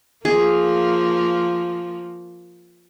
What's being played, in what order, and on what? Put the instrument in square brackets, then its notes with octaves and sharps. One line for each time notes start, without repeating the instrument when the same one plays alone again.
[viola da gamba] F3 A#3 [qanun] G#4